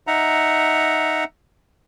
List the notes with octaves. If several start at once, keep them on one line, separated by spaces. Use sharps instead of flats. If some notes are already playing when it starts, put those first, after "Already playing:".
D#4 E5 F#5 A#5